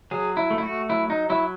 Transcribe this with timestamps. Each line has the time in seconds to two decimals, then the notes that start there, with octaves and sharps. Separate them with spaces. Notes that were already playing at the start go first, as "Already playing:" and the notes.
0.11 F#3 G#4
0.37 E4
0.50 A3
0.58 E4
0.63 F#4
0.89 F#3 E4
1.10 D#4
1.30 F#3 E4